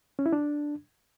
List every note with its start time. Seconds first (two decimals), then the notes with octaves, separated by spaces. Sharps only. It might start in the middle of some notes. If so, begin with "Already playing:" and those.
0.19 C#4
0.26 E4
0.32 D4